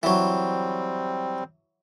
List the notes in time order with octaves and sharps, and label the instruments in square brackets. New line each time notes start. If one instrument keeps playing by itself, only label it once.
[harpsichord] E3 F#3 [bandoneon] G3 C4